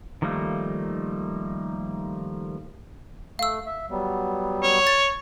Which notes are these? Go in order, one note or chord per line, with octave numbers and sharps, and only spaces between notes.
D#3 F3 G3 A3 A#3
A3 F5 E6
E5
F#3 G3 B3
C#5
A6